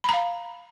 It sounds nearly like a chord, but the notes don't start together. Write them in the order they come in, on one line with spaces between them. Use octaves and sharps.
B5 A#5 F5